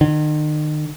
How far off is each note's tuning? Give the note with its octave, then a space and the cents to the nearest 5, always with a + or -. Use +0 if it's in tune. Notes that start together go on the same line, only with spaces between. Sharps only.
D#3 -40